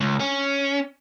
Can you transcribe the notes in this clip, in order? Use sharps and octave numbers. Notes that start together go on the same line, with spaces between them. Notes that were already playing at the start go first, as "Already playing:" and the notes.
C#2
C#4